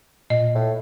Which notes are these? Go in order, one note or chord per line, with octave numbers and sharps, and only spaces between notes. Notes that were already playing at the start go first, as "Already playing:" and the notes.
A#2 D#5
A2